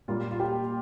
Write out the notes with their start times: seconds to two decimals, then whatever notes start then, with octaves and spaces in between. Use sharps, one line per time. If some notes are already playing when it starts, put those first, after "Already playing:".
0.08 A#2 G3 A#3 F4
0.31 F4
0.40 G4